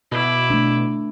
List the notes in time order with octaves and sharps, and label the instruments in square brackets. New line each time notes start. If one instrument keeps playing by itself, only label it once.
[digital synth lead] B2 [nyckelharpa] E4 D6
[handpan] A3 D4